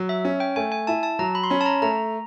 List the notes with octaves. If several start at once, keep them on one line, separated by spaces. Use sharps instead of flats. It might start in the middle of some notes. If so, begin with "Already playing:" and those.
Already playing: F#3
E5
C#4
G5
A3 G#5
G#5
E4 A5
A5
F#3 A#5
B5
C6
C#4 B5
A5
A#5
A3 A#5